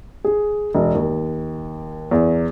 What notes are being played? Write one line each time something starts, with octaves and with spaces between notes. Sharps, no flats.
G#4
E1
D#2
E2